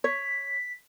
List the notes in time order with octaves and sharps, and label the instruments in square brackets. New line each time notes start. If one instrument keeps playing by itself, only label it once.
[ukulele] C#5 [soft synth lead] B6